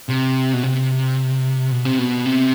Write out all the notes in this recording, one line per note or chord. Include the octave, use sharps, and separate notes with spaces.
C3
B2
C3
B2
C3
B2
C3